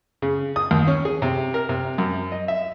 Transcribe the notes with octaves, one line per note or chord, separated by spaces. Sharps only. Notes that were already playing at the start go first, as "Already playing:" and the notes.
C#3
D#6
D#2
C#4
G#4
C3
A#4
C3
F#2
D#5
E5